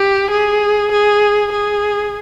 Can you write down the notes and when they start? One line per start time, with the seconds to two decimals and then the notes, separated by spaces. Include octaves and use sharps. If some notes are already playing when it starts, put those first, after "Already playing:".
Already playing: G4
0.30 G#4
0.91 G#4
1.52 G#4